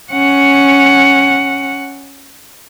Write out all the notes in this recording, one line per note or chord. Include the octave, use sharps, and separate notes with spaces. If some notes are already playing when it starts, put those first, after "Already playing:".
C#4 F#5